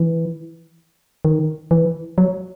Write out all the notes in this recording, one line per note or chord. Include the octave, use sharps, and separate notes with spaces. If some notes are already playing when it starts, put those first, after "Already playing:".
Already playing: E3
D#3
E3
F#3